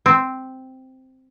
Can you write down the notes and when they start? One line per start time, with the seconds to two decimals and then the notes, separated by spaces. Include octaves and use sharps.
0.06 C4